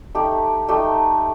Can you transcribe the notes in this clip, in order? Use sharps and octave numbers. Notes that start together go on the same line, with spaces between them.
A3 D#4 G4
A3 D#4 G4